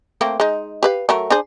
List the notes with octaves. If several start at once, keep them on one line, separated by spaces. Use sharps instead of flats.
A3 A#3 C4
G#3 D#4
G4 B4 F5
F#3 A3 A#4
D4 G#4 C5